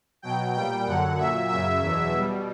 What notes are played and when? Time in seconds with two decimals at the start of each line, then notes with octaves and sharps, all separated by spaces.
0.22 B2 F#3 G5
0.54 A#2 G3 G5
0.86 F#2 D3 F#3 F#5
1.17 A#2 F#3 E5
1.48 F#2 C#3 F#3 E5
1.80 E2 B2 F#3
2.12 B2 G3